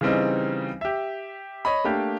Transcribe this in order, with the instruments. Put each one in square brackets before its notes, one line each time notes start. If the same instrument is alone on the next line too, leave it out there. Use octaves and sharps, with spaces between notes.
[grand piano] C#3 E3 G3 C4 D#4
G4 E5
C#5 D#5 B5
A3 A#3 D4 G4